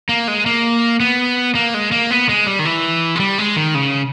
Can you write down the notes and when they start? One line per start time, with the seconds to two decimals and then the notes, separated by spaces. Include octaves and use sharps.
0.09 A#3
0.28 G#3
0.46 A#3
1.00 B3
1.55 A#3
1.74 G#3
1.92 A#3
2.11 B3
2.29 G#3
2.46 G3
2.59 D#3
2.65 E3
3.16 G#3
3.20 G3
3.38 G#3
3.56 D#3
3.75 C#3